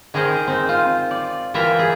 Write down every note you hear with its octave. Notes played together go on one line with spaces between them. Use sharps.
D#3 G#4 A#4 C5 D#5
C4 D#4
F4
D5
E3 F4 A#4 E5 G5 A#5
G#4